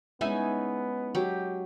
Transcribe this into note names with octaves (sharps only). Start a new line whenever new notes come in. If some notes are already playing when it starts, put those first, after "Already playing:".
G#3 B3 C#4 D#4 E4 E5 G#5
F#3 G4